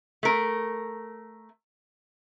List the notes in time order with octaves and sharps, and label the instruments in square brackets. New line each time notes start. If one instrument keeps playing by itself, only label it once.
[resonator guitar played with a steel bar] A3 A#4